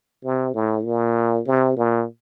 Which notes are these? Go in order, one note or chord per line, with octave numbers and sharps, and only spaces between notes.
C3
A2
A#2
C3
A#2